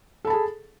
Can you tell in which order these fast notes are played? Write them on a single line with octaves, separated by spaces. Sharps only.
A4 B5 A5 G#4